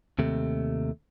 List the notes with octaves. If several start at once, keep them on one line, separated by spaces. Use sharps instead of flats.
D#2 C3 A3